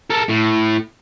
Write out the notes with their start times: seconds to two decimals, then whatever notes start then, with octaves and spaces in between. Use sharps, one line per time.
0.10 A4 A#4
0.29 A2